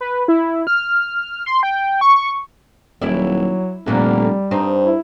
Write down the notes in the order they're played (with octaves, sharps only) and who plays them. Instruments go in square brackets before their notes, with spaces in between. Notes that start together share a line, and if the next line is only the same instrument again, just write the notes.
[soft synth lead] B4
E4
F6
C6
G5
C#6
[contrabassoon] D#1 [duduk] F#3 [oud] E4 D5
[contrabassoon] F1 [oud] D2 A#2 D3 [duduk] G3
[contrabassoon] G2 [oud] C4 D#4
[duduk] E4